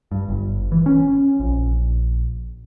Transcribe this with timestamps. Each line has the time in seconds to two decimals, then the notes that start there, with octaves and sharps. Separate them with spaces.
0.11 G2
0.28 G1
0.72 E3
0.86 C#4
1.40 A#1